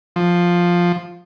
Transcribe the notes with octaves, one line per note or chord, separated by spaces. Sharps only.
F3